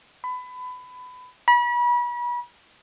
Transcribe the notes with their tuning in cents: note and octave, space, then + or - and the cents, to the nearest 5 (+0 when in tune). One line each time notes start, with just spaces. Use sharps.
B5 +25
B5 -35